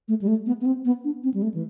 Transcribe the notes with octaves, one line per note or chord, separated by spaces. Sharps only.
A3
G3
A3
B3
B3
C4
B3
D4
C4
G3
A3
E3